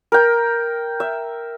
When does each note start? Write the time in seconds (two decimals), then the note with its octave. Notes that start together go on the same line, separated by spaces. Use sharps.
0.12 A#4 G5
1.00 E5